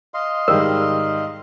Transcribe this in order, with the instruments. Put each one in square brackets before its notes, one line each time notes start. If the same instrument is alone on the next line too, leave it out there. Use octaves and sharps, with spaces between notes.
[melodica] D#5 F5 C6
[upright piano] G#2 D#3 G3 [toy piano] A#4